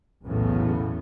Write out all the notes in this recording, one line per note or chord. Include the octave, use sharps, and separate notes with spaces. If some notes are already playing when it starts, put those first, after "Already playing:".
B1 E2 A2 C#3 B3